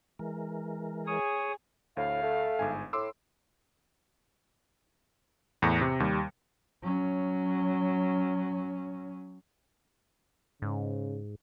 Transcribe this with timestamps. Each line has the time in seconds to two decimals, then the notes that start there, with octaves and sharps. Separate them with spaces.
0.19 E3 G#3 A#4
1.07 G#4 C#5 D#6
1.97 D2 A2 F5
2.23 A3
2.59 G1 G#2 G#5
2.93 A2 C6 D6 E6
5.62 E2 A2 A#6 C#7
5.81 C3
6.00 D#2 G3
6.83 F#3 C#4
10.62 G#2 C#3